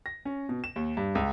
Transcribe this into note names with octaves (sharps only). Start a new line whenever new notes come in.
A#6
C#4
B2
E7
D#2
G2
C#2